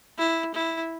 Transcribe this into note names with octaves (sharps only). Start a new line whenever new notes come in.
E4
E4